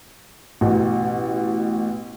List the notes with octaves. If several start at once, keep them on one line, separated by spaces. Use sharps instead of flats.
A1 B2